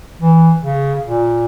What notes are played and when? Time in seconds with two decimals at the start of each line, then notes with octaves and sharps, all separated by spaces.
0.21 E3
0.63 C#3
1.07 A#2